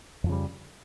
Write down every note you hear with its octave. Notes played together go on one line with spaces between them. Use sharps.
F2 C#3 F3 G3